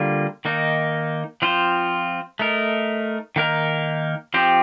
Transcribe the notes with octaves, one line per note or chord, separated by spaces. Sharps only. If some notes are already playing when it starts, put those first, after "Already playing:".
Already playing: D3 G3 A#3 F4
D#3 A#3 D#4
F3 C4 F4 C5
A3 D#4 A#4
D#3 A#3 D#4 A#4
F3 C4 G4 C5